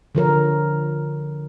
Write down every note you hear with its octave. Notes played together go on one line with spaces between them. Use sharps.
D3 F3 A#4 C#5